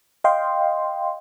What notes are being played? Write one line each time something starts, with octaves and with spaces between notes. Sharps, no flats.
D#5 F5 G5 C6